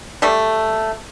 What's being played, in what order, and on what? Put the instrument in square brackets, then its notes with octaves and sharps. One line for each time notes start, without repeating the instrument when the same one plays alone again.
[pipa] G3 A3